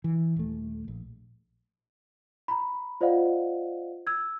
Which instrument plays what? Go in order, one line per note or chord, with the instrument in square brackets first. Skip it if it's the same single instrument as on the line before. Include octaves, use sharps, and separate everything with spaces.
[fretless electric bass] E3
D#1 A3
A#1
[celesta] A#5 B5
F4 C5 D5 D#5 F5 F#5
E6 G#6